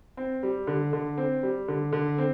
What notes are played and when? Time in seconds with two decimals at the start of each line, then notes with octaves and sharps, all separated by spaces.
0.17 C4
0.43 G3
0.67 D3
0.93 D3
1.18 C4
1.43 G3
1.68 D3
1.93 D3
2.18 C4